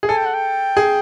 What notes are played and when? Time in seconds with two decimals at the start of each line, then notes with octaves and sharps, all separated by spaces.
0.03 G#4
0.09 A4 G#5
0.17 G5
0.25 F#5
0.34 G5
0.77 G#4